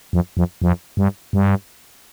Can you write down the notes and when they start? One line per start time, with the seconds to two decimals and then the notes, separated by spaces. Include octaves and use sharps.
0.13 F2
0.37 F2
0.62 F2
0.97 G2
1.33 G2